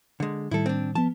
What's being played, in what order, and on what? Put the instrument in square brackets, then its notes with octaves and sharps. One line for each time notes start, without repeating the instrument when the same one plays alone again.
[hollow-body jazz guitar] D3 G#3
[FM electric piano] A2 D#3 G3 [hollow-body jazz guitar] E4 A4
[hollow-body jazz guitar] C4 D4
[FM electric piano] F3 B3 [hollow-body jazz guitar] A5